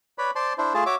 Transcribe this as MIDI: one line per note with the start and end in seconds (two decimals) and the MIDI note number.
0.18 0.31 71
0.18 0.31 73
0.18 0.31 74
0.18 0.31 83
0.35 0.53 72
0.35 0.53 74
0.35 0.53 81
0.35 0.53 84
0.58 0.73 62
0.58 0.73 64
0.58 0.73 72
0.74 0.84 57
0.74 0.84 65
0.74 0.84 68
0.74 0.84 81
0.86 0.95 66
0.86 0.95 73
0.86 0.95 76
0.86 0.95 86